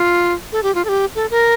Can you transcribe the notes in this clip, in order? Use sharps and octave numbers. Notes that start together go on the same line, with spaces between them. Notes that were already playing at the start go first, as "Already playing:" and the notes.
Already playing: F4
A4
G4
F4
A4
G4
A4
A#4